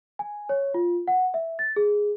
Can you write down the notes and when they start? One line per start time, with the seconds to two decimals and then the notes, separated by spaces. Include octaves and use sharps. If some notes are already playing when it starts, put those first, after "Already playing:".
0.19 G#5
0.49 C#5
0.74 F4
1.08 F#5
1.34 E5
1.59 A6
1.76 G#4